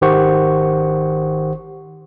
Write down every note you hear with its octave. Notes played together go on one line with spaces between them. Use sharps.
G#1 D#3 G4 C5 F#5 C#6